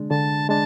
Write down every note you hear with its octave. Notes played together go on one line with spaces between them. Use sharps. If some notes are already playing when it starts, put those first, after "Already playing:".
Already playing: D3 G#3 D4
D3 A5
G#3 D4 A5